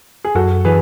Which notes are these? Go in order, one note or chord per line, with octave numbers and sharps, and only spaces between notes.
G#4
F#2 F#4 A4
E3 G#4 B4